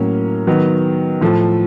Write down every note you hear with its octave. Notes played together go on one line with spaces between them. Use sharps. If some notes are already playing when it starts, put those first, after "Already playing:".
Already playing: A2 F#3 A#3 C#4
D#3 F#3 B3
A2 F3 A3